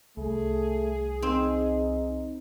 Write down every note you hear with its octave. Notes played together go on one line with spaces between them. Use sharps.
C2 A3 G#4
C4 D#4